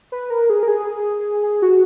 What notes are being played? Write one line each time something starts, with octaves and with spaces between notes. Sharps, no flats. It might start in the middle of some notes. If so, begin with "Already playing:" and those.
B4
A#4
G#4
A#4
G#4
G#4
F#4